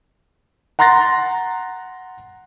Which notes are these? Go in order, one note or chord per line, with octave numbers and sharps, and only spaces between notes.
F#5 A#5 C6 F#6 A6 A#6